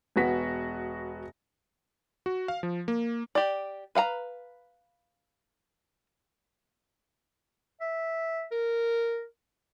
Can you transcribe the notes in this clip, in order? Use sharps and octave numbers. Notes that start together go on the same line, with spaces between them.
E1 B3 F#4 B6
F#4
F5
F3
A#3
G4 D5
B4 F5 F#5 A#5
E5
A#4